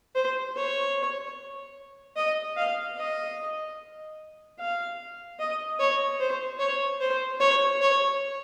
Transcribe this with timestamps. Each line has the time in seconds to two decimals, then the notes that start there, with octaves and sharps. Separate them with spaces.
0.15 C5
0.56 C#5
2.16 D#5
2.56 F5
2.97 D#5
4.59 F5
5.39 D#5
5.80 C#5
6.20 C5
6.59 C#5
7.01 C5
7.40 C#5
7.81 C#5